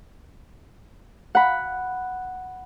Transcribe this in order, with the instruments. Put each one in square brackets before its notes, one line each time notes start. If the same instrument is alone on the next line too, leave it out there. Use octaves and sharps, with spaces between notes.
[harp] F#5 B5